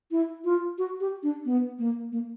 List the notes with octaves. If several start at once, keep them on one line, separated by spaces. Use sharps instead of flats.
E4
F4
F#4
G4
D4
B3
A#3
A#3